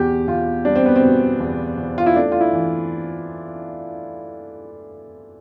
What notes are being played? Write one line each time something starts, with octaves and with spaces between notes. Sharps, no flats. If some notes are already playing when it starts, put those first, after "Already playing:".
Already playing: E2 B2 G4
E2 F4
G3 D4
C4
B3
C4
B2
E2
E2
F4
E4
A3 D4
F4
E4
E3